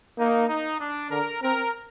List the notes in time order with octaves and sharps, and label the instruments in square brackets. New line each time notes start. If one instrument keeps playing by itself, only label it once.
[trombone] A#3 [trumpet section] D#4
[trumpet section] D#4
D4
[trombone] D3 [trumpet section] A#4
[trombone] C4 [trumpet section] A#4